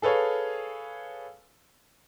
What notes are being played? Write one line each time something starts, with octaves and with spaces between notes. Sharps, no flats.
G#4 A4 B4 C#5 F5